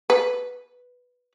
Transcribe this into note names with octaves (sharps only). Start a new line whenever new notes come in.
B4